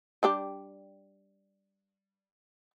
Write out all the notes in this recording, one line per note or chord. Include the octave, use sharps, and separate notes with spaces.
G3 D4 G4